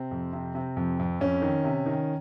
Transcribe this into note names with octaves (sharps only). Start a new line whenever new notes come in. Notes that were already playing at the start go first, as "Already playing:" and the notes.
Already playing: C3 C4
F2
C3
C3
F2
F2
F2 C#4
D#3
C3
D#3